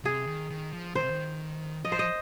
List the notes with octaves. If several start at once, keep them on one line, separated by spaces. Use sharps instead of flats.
C3 G#4
D#3
D#3
F3
D#3 C5
C3
D#3
F3 D#5
C5
D#5